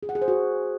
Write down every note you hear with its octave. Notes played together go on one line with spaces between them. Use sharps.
G#4
F#5
G#4
C5
F#4